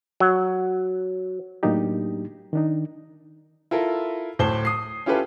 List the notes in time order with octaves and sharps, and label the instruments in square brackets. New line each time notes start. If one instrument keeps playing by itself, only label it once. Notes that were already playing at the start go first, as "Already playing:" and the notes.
[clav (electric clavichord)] F#3
[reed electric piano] A2 F#3 A#3 D4 D#4 G4
D#3 D4 D#4
[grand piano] E4 F4 A4 A#4
D1 A2 C5 A5 C6 G7
D#6 C7
C#4 E4 F4 G4 A4 B4